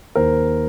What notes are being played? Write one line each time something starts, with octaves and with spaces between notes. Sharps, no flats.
D#2 A#4 C5